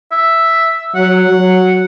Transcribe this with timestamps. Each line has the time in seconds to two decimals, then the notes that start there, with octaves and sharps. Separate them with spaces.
0.12 E5
0.96 F#3 F#5
1.28 F#3